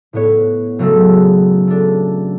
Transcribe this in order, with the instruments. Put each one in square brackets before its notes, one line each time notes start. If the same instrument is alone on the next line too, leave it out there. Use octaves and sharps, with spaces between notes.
[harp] A2 B3 C#5
F#1 F#3 G#3 A3 E6
A3 D4